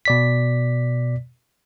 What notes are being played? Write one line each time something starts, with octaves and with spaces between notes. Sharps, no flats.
B2 D5 B6